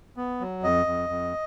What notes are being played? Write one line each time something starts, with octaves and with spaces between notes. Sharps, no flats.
B3
F#3
F2 D#5
F2
F2